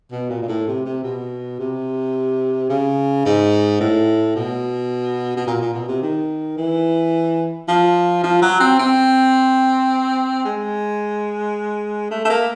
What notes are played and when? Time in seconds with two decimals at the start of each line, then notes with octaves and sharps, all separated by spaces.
0.12 B2
0.30 A#2
0.42 A#2
0.48 A2
0.67 C3
0.85 C3
1.04 B2
1.59 C3
2.69 C#3
3.25 G#2
3.81 A2
4.36 B2
5.37 B2
5.47 A#2
5.61 A#2
5.74 B2
5.88 C3
6.02 D#3
6.57 E3
7.68 F3
8.24 F3
8.42 F#3
8.60 C4
8.79 C4
10.45 G#3
12.11 A3
12.25 A3
12.30 A#3